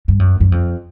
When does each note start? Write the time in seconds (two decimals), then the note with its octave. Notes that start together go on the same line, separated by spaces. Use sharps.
0.08 G2
0.20 F#2
0.40 F#2
0.52 F2